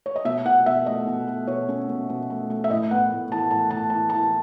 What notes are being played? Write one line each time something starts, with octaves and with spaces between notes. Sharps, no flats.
C#5
D#5
B2 E5
B2 F#5
B2 E5
A3 D#5
B2
A3
B2 C#5
C#4
B2
B2
A3
A3
E5
A2 D#5
B3 F#5
A2
E3 A5
A2 A5
A2 A5
E3 A5
E3 A5